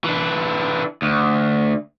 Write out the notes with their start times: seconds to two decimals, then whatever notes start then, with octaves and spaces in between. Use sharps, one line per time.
0.04 E3 D4
1.02 D2